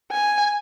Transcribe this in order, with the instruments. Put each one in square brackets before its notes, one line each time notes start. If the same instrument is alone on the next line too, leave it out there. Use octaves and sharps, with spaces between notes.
[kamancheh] G#5